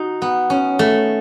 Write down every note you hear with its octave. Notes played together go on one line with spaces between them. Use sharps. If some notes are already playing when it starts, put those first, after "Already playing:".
Already playing: D#4 F#4
B3
C#4
A3